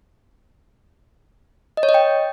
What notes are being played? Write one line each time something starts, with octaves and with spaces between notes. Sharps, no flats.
D#5
C#5
D#5
G5